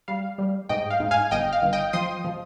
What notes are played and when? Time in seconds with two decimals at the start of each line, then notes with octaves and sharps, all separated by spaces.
0.08 G3 F5
0.38 G3
0.69 G#2 D#5 G5
0.90 F5
1.00 G#2
1.11 F5 G#5
1.31 G1 D#5 G5
1.53 F5
1.62 G1
1.73 D#5 G5
1.93 F3 C6 D#6
2.25 F3